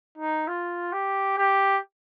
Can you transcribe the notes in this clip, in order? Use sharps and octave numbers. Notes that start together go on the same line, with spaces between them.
D#4
F4
G4
G4